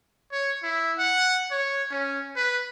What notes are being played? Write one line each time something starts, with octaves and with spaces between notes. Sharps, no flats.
C#5
E4
F#5
C#5
C#4
B4